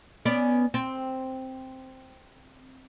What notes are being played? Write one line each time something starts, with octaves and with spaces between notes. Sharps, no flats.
B3 C#4 D5
C4